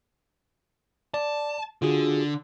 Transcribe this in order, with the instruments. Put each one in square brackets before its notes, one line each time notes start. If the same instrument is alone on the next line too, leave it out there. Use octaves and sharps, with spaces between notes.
[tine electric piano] D5 [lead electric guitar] A5
[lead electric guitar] D3 [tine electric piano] F4 F#4 G#4